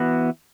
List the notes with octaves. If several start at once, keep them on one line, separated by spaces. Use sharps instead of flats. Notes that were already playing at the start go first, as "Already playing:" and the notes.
Already playing: E3 B3 F#4